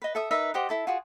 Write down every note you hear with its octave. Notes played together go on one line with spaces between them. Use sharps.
B4 D#5
A4 E5 D#6
D#4 A#4 B4 E5
G4 C5 D#5 F#5
E4 A4 A5
F4 F#4 G#4